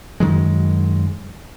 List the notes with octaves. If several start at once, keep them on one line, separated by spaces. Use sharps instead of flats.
F#2 D#3 F#3 G#3